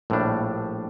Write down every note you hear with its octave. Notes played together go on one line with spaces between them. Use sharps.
A#1 A2 G3 D4